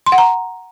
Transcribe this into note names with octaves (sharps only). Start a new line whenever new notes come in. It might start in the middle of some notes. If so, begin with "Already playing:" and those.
C6
F#5
A#5